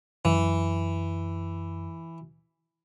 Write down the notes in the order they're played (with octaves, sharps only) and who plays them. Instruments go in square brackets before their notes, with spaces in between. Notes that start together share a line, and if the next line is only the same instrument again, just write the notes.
[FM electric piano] F#2 [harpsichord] E3